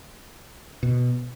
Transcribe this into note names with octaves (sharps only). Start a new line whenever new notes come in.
B2